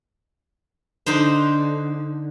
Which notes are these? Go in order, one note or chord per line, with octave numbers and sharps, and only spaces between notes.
D3 D#4 C5